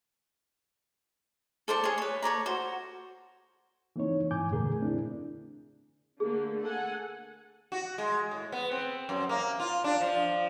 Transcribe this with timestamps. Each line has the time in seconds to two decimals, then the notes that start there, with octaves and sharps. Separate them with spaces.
1.68 A4 C5 D5 A5
1.84 G#4 C#5
1.98 B4 C#5
2.22 A4 C#5 D5 A#5
2.46 F#4 C5
3.96 E3 A#3 C4 D#4 C#5
4.31 G#2 E3 G#5 D6 G6
4.49 F2 A#2 D3 A3 G#4 A#4
4.81 C4 D4 E4
6.20 D3 A3 A#3 G#4
6.63 A4 F#5 G#5
7.72 F#4
7.98 G#3
8.31 A2
8.52 B3
8.71 C4
9.09 F#2
9.29 A#3
9.60 F4
9.84 D4
10.01 F3